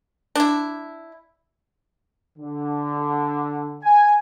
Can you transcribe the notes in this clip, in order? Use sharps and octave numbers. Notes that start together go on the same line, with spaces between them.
D4 E4
D3
G#5